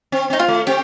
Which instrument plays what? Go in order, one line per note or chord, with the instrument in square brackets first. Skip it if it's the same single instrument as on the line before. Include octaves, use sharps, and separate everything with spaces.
[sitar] C4
[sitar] C4 [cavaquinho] D#4
[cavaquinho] F4
[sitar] A3
[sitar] C4 [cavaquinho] G4